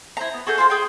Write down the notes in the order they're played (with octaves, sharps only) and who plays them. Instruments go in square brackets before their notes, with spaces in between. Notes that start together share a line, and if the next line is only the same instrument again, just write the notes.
[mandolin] E4 C5 A#5
B3
F#4 G#4 A4 G6
F4 G#4 C5
G#4 G5